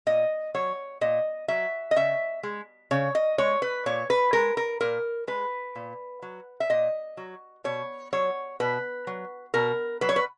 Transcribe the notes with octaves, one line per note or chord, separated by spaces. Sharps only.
A#2 D#5
F#3 C#5
A#2 D#5
F#3 E5
D#5
C#3 E5
G#3
C#3 C#5
D#5
G#3 C#5
B4
A#2 C#5
B4
G#3 A#4
A#4
A#2 A#4
G#3 B4
A#2
F#3
E5
A#2 D#5
F#3
B2 C#5
F#3 C#5
B2 B4
F#3
B2 A#4
F#3 B4
C#5
B4